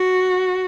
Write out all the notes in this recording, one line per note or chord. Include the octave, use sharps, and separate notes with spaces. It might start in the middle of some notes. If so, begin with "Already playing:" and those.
Already playing: F#4